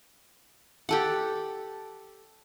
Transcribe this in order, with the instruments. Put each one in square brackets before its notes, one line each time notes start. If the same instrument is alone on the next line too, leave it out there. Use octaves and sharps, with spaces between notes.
[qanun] G4 A4 F#5